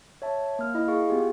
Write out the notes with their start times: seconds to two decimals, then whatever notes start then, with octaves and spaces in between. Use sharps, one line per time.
0.22 C#5 E5 A5
0.59 A#3 F6
0.74 E4 D#5
0.88 G#4 F5 C#6
1.09 B3 F4 G4 G#4